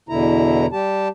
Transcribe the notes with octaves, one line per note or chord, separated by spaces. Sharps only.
E2 B2 D3 E4 A#5
G3 G4 A5